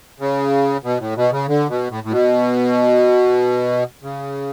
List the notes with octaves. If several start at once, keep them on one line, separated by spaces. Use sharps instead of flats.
C#3
B2
A2
B2
C#3
D3
B2
A2
A2
B2
C#3